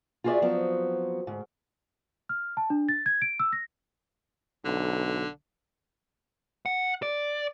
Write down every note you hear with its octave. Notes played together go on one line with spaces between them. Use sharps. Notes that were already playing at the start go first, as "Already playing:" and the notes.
F4 F#4 G#4 A#4 D5 E5
F3 F#3 B3 C4
D2 G#2
F6
A5
D4
A6
G#6
D7
E6
A#6
B1 D3
F#5
D5